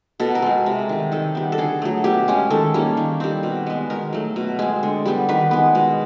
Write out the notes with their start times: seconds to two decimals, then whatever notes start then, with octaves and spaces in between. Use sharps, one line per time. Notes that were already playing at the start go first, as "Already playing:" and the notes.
0.20 B2 A4
0.35 A#4
0.42 G#3 C4
0.66 C3
0.89 D#3 G3
1.12 D#3 A4
1.35 G3 B3
1.52 A4
1.58 D3 G#4
1.82 F#3 A3
2.04 B2 G4
2.28 G#3 C#4
2.50 D#3 A4
2.74 G3 A#3 C#4
2.97 D#3
3.20 G3 C4
3.43 B2
3.66 G#3 B3
3.90 D#3 A#4
4.13 F#3 A3
4.36 B2
4.59 G#3 C4
4.83 D3
5.06 G3 B3
5.29 D#3 B4
5.51 G#3 B3
5.75 B2